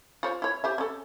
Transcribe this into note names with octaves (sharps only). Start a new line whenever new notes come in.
F4 C5 C#5
E4 C#5
G4 C5 E5
C#4 A4